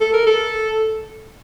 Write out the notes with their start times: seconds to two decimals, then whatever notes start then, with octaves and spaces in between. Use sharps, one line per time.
0.01 A4
0.14 A#4
0.27 A4